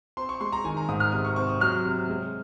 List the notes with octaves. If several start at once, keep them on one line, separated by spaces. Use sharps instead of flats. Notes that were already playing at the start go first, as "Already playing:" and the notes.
C4 C6
C#6
G#3 C6
A#5
D#3 G#5
A#5
G#2 D#6
F6
C3 D#6
C#6
C4 C#6
D#6
F#3 F6
C3
G#3